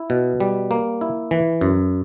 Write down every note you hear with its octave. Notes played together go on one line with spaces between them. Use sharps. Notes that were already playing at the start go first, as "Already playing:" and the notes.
Already playing: E4
B2
G3
A#3
E4
E3
F#2